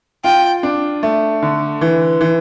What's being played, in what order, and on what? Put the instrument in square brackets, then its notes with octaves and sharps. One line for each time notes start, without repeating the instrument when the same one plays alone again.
[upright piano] F4 [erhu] G5
[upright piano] D4
A3
D3
E3
E3